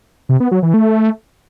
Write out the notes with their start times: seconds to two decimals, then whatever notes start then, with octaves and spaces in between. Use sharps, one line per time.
0.29 C3
0.40 B3
0.51 F#3
0.63 E3
0.74 A3